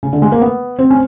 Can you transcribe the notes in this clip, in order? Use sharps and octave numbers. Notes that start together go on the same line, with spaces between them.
C#3
D3
G#3
A#3
B3
C4
C#4